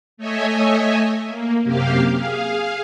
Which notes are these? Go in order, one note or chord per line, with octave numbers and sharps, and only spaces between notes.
A3 C#5 D#5 E5 G#5
A#3
F#2 C3 A#3 G4 F5
G#4 F5